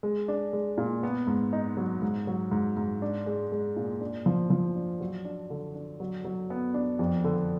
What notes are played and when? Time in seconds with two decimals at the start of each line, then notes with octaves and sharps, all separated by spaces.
0.03 G#3
0.28 D4
0.53 G#3
0.78 A#2
1.03 B3
1.27 G#2
1.53 D#4
1.77 F#3
2.02 G#2
2.27 F#3
2.51 G#2
2.77 G#2
3.02 D4
3.26 G#3
3.52 G#3
3.76 A#2
4.01 D4
4.26 F3
4.50 F3
4.75 D4
5.00 F#3
5.25 D4
5.50 D3
5.75 D4
6.00 F#3
6.24 F#3
6.50 B3
6.74 D4
6.99 F2
7.24 D3